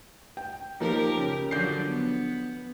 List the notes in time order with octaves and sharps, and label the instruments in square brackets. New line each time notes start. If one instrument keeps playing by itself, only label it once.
[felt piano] G5
[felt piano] F3 A#3 D#4 [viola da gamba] G4 A#4
[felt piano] C#3
[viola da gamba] D3 F3 F#3 [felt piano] G6 C7
[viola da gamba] B3